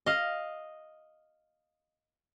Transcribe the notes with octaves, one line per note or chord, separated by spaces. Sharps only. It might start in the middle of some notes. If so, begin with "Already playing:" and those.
D#5 F5